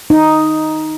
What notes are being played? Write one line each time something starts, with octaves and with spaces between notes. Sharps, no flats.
D#4